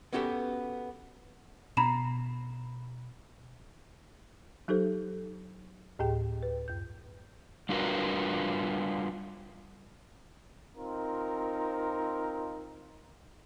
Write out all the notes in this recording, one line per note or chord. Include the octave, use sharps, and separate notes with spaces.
B3 C#4 F#4 G4 A4 B4
B2 A#5 B5 E7
F#3 D#4 G4 A4 C5
D2 A2 G4 G#4 G5
B4
F#2 G6
G3 D4 F4 F#4 A#4 B4
C4 D#4 F4 A#4